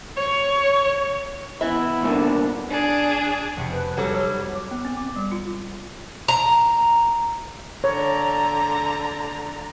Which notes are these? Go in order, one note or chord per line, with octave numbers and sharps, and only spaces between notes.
C#5
E3 B3 E4 E5
C2 A#2 D3
D4 G#4
F1 C#7 D7
B4
F#3 G3 A4 C#5
C#5 E6
D6
B3
C4
D6
G3
F4
A#5
D3 C#5 A#5